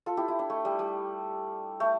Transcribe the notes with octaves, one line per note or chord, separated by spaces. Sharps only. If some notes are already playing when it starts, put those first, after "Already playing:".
F4 A4
E4 G4
E4
D4
A3
G3
G3
A3